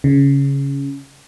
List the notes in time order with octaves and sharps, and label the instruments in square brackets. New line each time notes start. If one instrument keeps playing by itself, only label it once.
[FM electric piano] C#3